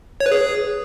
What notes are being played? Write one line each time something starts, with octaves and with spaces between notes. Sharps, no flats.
C#5
B4
G#4